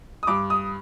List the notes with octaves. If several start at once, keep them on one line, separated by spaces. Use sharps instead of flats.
D#6
G2 D6
D#6